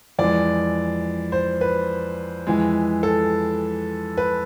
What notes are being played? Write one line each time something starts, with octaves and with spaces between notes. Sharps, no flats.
F2 E3 G#3 D5
C5
B4
F2 E3 G#3
A4
B4